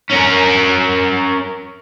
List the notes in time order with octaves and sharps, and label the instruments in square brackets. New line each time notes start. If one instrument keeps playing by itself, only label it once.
[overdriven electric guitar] C#4 A#4